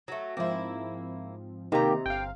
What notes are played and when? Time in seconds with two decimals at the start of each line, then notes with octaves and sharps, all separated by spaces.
0.08 F#3 A3
0.37 G#2 F3 A#3 C4 E4
1.72 C3 D#3 A#3 D#4 G4 A#5
2.06 G1 F5 G5